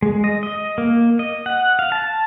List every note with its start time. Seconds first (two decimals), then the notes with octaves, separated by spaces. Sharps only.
0.02 G#3
0.24 D#5
0.43 D#5
0.78 A#3
1.19 D#5
1.46 F#5
1.79 F5
1.92 A5